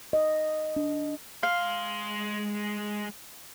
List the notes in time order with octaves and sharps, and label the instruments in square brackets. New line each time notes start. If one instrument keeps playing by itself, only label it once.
[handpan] D#5
D4
[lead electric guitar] G#3 C6 [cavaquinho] F5